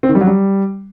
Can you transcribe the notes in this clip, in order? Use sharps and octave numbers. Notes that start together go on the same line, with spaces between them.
C4
D#3
G3
F#3
G3